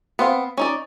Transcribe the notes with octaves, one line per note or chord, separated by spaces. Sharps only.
B3 C4 F5
C#4 D#4 D5